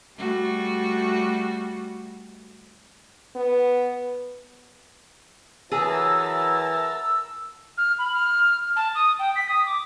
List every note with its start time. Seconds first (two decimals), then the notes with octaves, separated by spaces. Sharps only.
0.18 G3 A3 F#4
3.36 B3
5.72 E3 F#3 G#4 A#4 A5 E6
7.77 F6
7.98 B5
8.13 F6
8.76 A5
8.95 D#6
9.19 G5
9.36 B6
9.49 D#6
9.66 D6